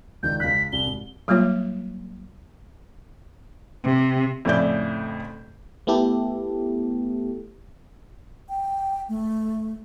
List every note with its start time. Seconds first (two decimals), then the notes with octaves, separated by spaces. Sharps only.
0.23 C#2 D#3 D5 G6
0.40 C#2 F5 F#6 B6
0.73 C2 G7
0.86 G#1
1.28 F#3 G3 A#3 F4 C#5
3.84 C3
4.45 F2 A2 C#3 E4 D5 G6
5.87 A3 B3 E4 G4 A4
8.49 G5
9.09 A3